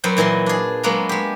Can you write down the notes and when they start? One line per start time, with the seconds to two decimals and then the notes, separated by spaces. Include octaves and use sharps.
0.04 F#2 F#3 B3 C5 G5
0.17 A#2 E3 F#3 D#5 C6
0.46 D4 G#4
0.83 F#3 G#3 A#3 B3 B4 A#5
1.09 G#3 G4